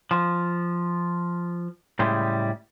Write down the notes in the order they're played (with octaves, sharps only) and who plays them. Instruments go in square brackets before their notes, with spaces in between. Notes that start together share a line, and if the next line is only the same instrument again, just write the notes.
[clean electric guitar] F3
A2 C#3 G3 G#3